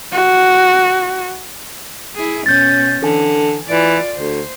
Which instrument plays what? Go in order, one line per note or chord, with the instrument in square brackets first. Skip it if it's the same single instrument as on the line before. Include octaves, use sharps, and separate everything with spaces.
[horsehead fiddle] F#4
[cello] E4 G#4
[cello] B2 C#4 [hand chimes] G6 A6
[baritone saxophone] D3 [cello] E3 [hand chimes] A4 G#5
[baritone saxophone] E3 [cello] F4 D5
[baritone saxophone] D2 [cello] C5